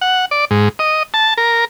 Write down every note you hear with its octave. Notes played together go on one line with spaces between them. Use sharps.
F#5
D5
G#2
D#5
A5
A#4